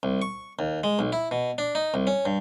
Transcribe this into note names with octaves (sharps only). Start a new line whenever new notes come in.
C2
C#6
D#2
G#3
B1
E4
B2
D4
D#4
C2
C#4
G2